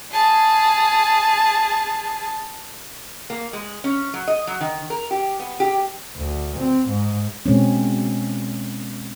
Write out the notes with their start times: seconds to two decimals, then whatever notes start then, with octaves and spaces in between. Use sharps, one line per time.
0.12 G#4 A5
3.30 A#3
3.53 G#3
3.84 C#4
4.14 F#3
4.28 D#5
4.47 F#3
4.61 D#3
4.90 A#4
5.11 G4
5.40 B3
5.60 G4
6.17 D2
6.59 C4
6.89 G#2
7.46 B2 G#3 C4 C#4